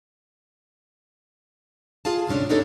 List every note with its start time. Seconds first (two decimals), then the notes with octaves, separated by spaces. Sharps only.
2.05 F4 G#4 F5 G#5 A5
2.27 D2 G#2 C3 C#4 D4
2.49 B3 D4 D#4 G4 A4 C#5